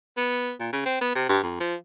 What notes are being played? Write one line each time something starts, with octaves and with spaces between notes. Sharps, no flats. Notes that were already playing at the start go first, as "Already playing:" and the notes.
B3
A#2
C#3
C4
B3
C3
G2
F2
F3